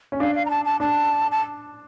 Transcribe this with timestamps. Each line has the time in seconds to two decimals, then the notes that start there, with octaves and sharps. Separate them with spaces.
0.12 C#4
0.20 D4 F5
0.35 F5
0.46 A#5
0.50 A5
0.65 A5
0.80 D4 A5
1.32 A5